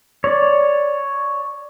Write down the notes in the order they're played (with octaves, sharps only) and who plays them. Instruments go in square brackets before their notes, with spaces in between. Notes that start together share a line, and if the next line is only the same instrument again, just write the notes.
[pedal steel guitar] C#5 D5